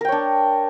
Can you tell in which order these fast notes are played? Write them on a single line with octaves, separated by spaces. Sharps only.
A#4 G5 C#5 D4